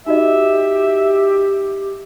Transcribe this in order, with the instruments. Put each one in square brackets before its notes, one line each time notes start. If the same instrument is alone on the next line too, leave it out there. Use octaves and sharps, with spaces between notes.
[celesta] D#4 F#4 D#5 [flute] G4 [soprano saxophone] E5